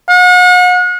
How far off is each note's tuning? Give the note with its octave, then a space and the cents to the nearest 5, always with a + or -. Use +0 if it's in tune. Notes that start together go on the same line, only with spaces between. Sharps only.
F#5 -40